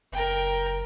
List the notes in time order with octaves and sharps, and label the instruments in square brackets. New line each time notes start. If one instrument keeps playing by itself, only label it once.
[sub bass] F#1 [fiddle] A#4 G5